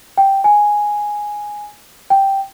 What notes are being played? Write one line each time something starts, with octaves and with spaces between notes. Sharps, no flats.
G5
G#5
G5